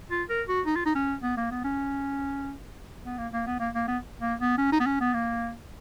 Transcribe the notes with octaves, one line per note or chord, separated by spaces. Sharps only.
F4
A#4
F#4
D#4
F4
D#4
C#4
B3
A#3
B3
C#4
B3
A#3
A#3
B3
A#3
A#3
B3
A#3
B3
C#4
D#4
B3
C#4
B3
A#3